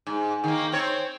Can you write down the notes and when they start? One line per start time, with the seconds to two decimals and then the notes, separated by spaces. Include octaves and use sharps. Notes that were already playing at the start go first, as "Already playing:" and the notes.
0.07 G#2
0.44 D#3 A#3
0.72 C4 C#5